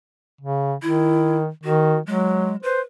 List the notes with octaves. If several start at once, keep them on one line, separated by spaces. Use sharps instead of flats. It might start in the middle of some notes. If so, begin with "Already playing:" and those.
C#3
D#3 E4
D#3 F#4
F#3 G#3
B4 C5